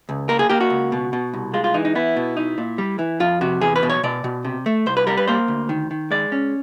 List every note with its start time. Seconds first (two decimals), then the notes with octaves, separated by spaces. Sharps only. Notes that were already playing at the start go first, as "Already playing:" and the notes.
0.09 C#2
0.29 A#3 A#4
0.39 G#4
0.49 A#3 G4
0.61 F#4
0.70 C#2
0.92 B2
1.13 B2
1.33 C2
1.54 G#3 F4
1.64 F4
1.74 E3 D#4
1.85 D#4
1.95 B3 E4
2.16 B2
2.37 D#4
2.58 A#2
2.78 G3
2.99 E3
3.20 F2 F4
3.41 C3 F#4
3.61 E2 G#4
3.76 B4
3.83 B2
3.89 C#5
4.03 B2 D5
4.24 B2
4.45 C3
4.66 A3
4.86 C2 C5
4.97 B4
5.07 G3 A#4
5.17 B4
5.28 A#3 C5
5.48 D2
5.69 D#3
5.91 D#3
6.11 G#3 D5
6.32 C#4